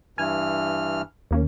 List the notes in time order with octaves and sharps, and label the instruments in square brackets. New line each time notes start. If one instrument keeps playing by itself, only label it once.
[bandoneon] G2 E3 F6 [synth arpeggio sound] G#5
[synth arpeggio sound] D#2 A#3 C#4